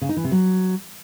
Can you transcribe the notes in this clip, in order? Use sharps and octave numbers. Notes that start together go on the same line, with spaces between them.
C#3
D#4
E3
C3
F#3